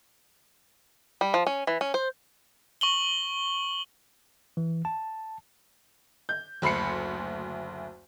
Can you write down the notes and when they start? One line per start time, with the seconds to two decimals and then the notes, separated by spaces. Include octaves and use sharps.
1.21 G3
1.34 F3
1.47 C#4
1.67 E3
1.81 C#4
1.94 C5
2.81 C#6 F#7 G7
4.57 E3
4.85 A5
6.29 G6
6.62 F#1 D2 B5 C7 C#7